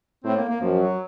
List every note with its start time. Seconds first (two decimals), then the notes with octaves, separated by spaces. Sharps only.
0.24 A2 C4
0.37 A#3
0.49 A#3
0.61 F#2 F3
0.79 F#3